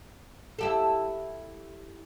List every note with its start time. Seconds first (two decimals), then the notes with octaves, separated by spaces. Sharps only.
0.59 E4 G4 A4